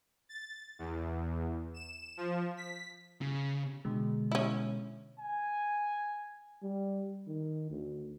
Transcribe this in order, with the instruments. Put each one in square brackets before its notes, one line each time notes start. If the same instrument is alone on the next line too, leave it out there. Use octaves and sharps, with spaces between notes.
[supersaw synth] A6
E2
E7
F3
B6
[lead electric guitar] C#3
[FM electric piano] B2 D3 G#3
[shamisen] C#4 E4
[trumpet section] G#5
[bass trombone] G3
D#3
D2